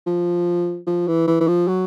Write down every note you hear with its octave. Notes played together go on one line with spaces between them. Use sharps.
F3
F3
E3
E3
E3
F3
F#3